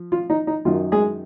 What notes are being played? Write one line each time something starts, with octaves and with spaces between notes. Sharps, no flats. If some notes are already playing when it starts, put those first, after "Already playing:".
Already playing: F3
F4
D#4
D#4
F#2 D#3 F#3 F4
G#3 G#4